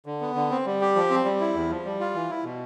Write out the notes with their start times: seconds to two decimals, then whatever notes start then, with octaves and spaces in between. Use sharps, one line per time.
0.06 D3
0.21 B3
0.35 D3
0.51 C4
0.66 G3
0.81 G4
0.96 F3
1.10 C4
1.25 G3
1.40 E4
1.55 E2
1.70 F3
1.85 G3
2.00 F4
2.15 E3
2.30 E4
2.44 B2